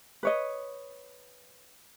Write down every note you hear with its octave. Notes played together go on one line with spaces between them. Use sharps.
B4 C#5 D#5